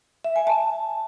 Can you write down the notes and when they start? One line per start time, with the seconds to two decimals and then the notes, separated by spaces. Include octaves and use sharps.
0.24 E5
0.36 G#5
0.47 A5